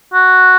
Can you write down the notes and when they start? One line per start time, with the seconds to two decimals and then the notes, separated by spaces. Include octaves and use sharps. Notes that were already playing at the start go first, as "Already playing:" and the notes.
0.14 F#4